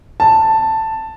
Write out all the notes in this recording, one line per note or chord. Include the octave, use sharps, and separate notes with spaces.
A5